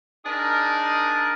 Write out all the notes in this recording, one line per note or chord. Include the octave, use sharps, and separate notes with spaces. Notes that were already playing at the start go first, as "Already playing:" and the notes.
D4 D#4 G#4 A#4